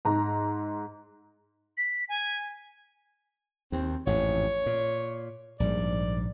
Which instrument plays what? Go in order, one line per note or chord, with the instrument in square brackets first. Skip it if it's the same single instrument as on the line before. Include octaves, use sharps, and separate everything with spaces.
[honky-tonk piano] G#2 A#5
[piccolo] B6
G#5
[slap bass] D#2 [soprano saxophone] C4
[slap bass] A1 F2 G#2 [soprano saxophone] C#5
[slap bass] A#2
[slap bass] A#1 G#2 G3 [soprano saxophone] D5